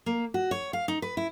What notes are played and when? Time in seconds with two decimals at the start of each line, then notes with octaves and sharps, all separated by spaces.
0.06 A#3
0.34 F#4
0.51 C#5
0.73 F5
0.88 D#4
1.02 B4
1.17 E4